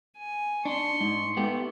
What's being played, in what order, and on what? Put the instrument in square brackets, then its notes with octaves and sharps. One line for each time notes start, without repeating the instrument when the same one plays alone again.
[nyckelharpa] G#5
[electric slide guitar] D4 [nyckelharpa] C6 C#6
[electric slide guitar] G#2
[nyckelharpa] A3 [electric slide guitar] B3 G4